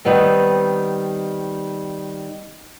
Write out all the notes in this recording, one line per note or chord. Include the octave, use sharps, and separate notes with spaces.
D#3 G3 B3 C4